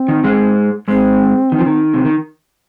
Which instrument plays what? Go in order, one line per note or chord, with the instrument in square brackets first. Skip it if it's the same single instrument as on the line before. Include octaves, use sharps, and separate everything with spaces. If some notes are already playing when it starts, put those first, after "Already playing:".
Already playing: [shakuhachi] C4
[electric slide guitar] D#3
G#2 G#3
[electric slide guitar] G#2 G#3 [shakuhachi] C4
[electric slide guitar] D#3
F3
D#3
C3
D#3